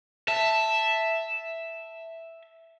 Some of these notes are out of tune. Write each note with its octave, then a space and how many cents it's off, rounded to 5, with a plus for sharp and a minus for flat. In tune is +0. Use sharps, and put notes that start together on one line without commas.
E5 +0 A5 +0